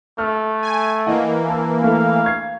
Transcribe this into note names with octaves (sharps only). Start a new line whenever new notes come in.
A3 F6
G#5
E3 A#3 D#5 F#5
A5 E6
A3 E4 A4 F5
C#6 G#6 C7